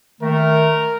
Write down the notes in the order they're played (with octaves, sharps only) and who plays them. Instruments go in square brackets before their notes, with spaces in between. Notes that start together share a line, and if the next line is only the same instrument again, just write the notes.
[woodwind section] D#3 A3 [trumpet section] A#4